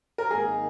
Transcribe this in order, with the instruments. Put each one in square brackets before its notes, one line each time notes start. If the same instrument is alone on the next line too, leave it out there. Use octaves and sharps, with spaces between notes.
[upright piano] A#4
[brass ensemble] G#1 G#2 D#3 A#3 D#4 [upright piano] G#4